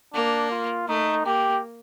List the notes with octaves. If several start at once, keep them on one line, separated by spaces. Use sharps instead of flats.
A#3 D4
F4
A3 D#4
A#3 G4